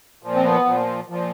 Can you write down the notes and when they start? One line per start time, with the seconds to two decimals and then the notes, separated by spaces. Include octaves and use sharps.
0.23 A#2 F3
0.35 C4
0.44 B3
0.66 A#2 F3
1.08 A#2 F3